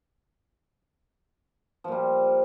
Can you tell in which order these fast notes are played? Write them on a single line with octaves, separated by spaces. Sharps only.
F3 A#2 G3